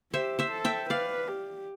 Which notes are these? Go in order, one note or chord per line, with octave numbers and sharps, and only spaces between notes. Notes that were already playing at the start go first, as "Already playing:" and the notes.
G4 C5 E5
C5 E5
A4
E5 G5
B4 D5 F5
G4